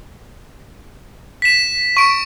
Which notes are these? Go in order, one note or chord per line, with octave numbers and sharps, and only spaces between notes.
B6 E7
C#6 D7